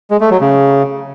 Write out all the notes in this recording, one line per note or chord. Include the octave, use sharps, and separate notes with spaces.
G#3
A3
F#3
C#3